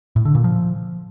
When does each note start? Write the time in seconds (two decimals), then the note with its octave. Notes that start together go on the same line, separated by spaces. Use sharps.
0.16 A2
0.25 D3
0.35 A#2
0.44 F3